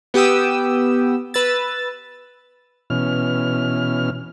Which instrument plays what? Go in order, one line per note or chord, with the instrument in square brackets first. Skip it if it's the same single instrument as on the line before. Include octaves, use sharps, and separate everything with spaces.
[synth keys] B3 G4 G5 D#6 E6
B4 E6 A6
[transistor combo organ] B2 E3 C#4 F6